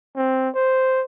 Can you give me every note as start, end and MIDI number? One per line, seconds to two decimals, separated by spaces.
0.16 0.49 60
0.55 1.03 72